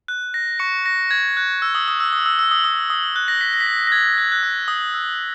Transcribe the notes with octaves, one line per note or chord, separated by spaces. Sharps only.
F#6
A#6
C#6 C#7
A#6
G#6
F#6
E6
D#6
D#6
E6
D#6
E6
E6
D#6
D#6
D#6
F#6
A#6
B6
A#6
B6
A#6
A#6
G#6
F#6
F#6
E6
D#6
E6